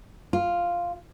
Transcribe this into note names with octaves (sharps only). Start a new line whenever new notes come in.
F4